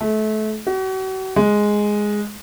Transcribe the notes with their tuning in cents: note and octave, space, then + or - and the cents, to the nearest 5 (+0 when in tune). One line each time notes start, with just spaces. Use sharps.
A3 -30
F#4 +40
G#3 +0